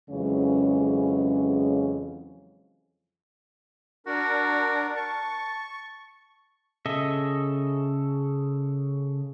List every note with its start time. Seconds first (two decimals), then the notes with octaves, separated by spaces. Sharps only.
0.10 F2 C#3 E3 F#3 G#3 C#4
4.07 D4 F#4 A#4
4.96 A5 C#6
6.86 C#3 A4 D#5 E5